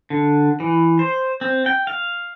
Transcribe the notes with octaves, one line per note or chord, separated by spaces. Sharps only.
D3
E3
C5
C4
G5
F5